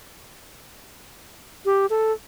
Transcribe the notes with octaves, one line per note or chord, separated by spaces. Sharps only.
G4
A4